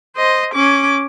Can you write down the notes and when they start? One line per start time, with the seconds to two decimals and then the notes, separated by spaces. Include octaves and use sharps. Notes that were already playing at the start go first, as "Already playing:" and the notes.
0.17 C5 D#5
0.54 C#4 D6